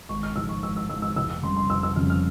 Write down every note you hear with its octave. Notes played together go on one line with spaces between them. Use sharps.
G#1 C#6
F6
G#2 F3 G#3 E6
C#6
G#1 E6
E6
G#2 F3 G#3 E6
E6
F1 E6
E6
F2 C#3 G3 C6
C6
F1 E6
E6
F2 C#3 G3 F6
F6